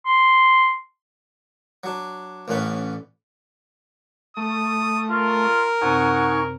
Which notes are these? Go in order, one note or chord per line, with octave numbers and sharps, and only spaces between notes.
C6
F#3 D4
A1 A2 D3 C#4 B4
A3 D#6
F4 A#4
F#2 C3 C4 D#4 F#5 G#5 C#6